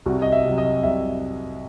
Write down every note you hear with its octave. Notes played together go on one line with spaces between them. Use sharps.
C2 F#4
D#5
E5
C3 F#3
D#5
C2 E5